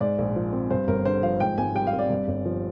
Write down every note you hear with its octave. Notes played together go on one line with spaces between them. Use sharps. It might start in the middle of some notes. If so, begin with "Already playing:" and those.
G#2 D5
A#1
F3
C4
G2 C5
G1 A#4
D3 C5
F3 F5
G#2 G5
G#1 G#5
G3 G5
F5
C4
D5
G2
G1
F3